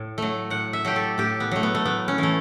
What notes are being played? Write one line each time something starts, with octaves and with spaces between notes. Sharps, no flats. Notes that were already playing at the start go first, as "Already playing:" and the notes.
Already playing: A2
F#3 A3
A2 F#5
E5
F#3 A3 G4
A4
A2 G4
B3
F#3 A3
B3
A3
A2 B3
C#4
E3 A3